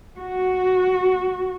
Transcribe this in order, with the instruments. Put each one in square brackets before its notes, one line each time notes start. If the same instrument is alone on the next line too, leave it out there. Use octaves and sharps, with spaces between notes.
[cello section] F#4